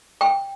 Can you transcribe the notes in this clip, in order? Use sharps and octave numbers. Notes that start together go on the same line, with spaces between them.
G5